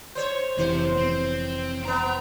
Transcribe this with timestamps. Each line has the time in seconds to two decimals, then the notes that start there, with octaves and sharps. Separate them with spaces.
0.15 C5 C#5
0.58 F1 C3 E3 C5
0.98 C4
1.85 B3 C4 A#5